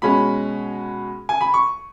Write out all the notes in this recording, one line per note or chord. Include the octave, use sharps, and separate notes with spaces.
B2 G#3 C#4 B5
G#5
B5
C#6